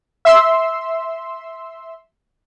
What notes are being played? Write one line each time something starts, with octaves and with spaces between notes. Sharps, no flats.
E5 C6 E6